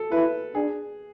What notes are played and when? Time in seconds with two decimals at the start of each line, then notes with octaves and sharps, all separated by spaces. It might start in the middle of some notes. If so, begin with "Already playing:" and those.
Already playing: A4
0.12 E4 B4
0.55 D4 G#4